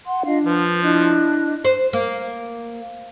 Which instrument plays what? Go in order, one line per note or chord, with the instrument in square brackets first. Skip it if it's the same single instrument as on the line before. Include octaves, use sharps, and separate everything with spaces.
[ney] F#5 [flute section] C6
[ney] D4 [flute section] F4 D#5 F5
[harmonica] F3 [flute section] B4
[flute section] D4 D#5 F#6 [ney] E4
[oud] C5
A#3